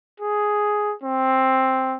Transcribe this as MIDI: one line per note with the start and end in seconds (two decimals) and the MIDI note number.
0.20 0.94 68
1.03 1.97 60